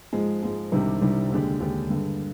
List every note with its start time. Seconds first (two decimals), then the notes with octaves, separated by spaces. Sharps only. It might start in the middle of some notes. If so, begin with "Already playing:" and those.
0.13 G#2 F3 G#3
0.43 G#2 F3 G#3
0.72 C2 C3 D#3 G3 D4
1.01 C2 C3 D#3 G3 D4
1.31 D#2 D3 G#3 D4 G4
1.60 D#2 D3 G#3 D4 G4
1.90 G2 D3 G#3